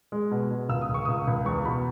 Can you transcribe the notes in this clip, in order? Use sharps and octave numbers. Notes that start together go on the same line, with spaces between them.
G#3
B2
B2
C#2 E6
D#6
C#2
C#6
C#2 D#6
C#2
E2 C#6
B2 B5